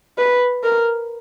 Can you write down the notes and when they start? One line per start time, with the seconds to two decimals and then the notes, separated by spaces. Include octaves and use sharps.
0.18 B4
0.63 A#4